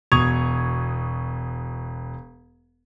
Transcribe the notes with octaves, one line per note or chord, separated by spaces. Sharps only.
E1 B2 C#6 D#6 G#6 F7